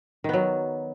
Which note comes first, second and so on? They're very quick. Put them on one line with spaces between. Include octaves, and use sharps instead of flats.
D#3 B3 F#3